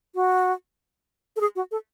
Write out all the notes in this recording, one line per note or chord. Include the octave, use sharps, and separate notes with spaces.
F#4
A4
G#4
F#4
A4